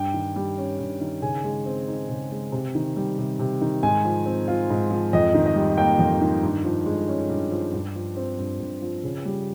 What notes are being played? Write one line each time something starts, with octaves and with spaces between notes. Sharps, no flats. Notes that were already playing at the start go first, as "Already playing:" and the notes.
Already playing: G2 G5
D#3
G3
C#4
G2
D#3
C#3 G#5
G#3
C4
D#4
C#3
G#3
C3
D#3
G3
C3
C3
D#3
G#2 G#5
F3
C4
F4
G#2
F3
F2 D#5
D#3
D#5
G3
A#3 G5
F2
D#3
G2
F3
G#3
C#4
G2
F3
G2
F3
C4
G2
G2
F3
C#3
G3